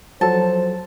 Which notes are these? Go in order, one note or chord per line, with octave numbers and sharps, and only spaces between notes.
F3 F#3 A4 C5 A5